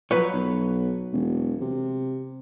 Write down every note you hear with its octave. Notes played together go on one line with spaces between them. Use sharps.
F3 F#3 B4 C#5
B1
E1
C3